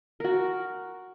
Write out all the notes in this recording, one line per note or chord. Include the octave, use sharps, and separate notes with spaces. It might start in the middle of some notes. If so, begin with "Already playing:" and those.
F#4 A#4